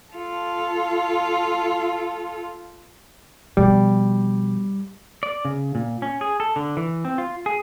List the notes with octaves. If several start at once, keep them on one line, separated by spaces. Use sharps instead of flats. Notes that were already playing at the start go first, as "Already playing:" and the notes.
F4 A4
B2 F3 G3
D5
C#3
A#2
C#4
G#4
A4
D3
E3
C4
F4
G#4